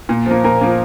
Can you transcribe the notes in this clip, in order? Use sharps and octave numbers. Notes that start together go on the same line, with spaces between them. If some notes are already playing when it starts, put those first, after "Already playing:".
A#2
F3 A#3
A#2 A#4
F3 A#3